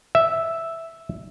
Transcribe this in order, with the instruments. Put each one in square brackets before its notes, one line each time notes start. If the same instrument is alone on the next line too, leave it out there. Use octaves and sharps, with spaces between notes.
[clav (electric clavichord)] E5